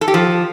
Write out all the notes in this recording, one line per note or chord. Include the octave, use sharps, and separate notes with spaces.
A4
G4
F3